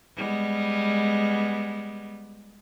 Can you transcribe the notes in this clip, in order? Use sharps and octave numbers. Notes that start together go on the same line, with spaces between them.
G3 G#3 B3